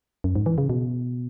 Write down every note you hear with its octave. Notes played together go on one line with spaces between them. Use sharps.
F#2
G#2
E3
C#3
B2